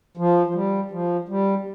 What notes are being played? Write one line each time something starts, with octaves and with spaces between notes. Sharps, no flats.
F3
F3
G3
F3
G3